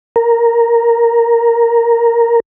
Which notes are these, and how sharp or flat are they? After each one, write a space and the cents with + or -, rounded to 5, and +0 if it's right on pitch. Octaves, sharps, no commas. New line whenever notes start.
A#4 +0